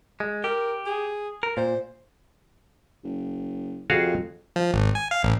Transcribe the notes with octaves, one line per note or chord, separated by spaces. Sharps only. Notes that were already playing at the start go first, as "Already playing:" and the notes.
G#3
G4 A#4
G#4
A#4
A#2 C5
F#1
F2 F#4 G#4 F5
F3
G#1
G#5
F5
A1